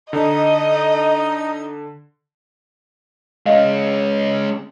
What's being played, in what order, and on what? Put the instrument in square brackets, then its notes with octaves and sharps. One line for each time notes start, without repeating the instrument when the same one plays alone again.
[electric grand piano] D3 [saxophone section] D#4 [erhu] D#5
[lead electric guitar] G#3 C#4 [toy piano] D#5 F5